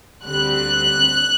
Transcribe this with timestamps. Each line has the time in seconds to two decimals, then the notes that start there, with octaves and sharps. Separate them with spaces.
0.25 D2 D3 G3 C4 F#6